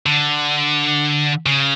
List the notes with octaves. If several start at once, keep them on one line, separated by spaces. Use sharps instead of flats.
D3
C#3